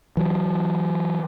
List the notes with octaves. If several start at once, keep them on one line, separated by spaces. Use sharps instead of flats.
E3 F#3